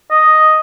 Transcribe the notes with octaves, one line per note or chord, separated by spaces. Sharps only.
D#5